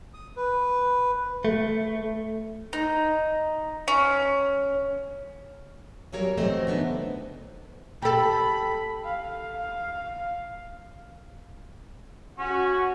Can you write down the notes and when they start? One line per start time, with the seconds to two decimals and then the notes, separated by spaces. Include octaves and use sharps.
0.14 D#6
0.36 B4
1.45 A3
2.73 D#4
3.88 C#4
6.12 E2 C#3 F#3 G3 A#4 C#5
6.37 E3 F#3 A3 C4 C5 D#5
6.67 C#3 B3 D4 D#4
8.02 G4 A4 B5
9.05 F5
12.38 C#4 F#4